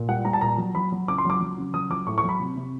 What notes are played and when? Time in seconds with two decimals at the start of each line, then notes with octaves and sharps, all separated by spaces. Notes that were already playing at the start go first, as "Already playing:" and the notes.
Already playing: A#2
0.09 G3 F#5
0.25 G3 A#5
0.33 A5
0.41 A#2 A#5
0.58 F#3
0.75 F#3 B5
0.92 F#3
1.08 C#3 D6
1.18 C6
1.25 F#3 D6
1.41 F#3
1.58 C#3
1.74 F#3 D#6
1.90 F#3 D6
2.07 A2 C#6
2.18 C#6
2.23 F#3
2.29 B5
2.40 C3
2.57 C3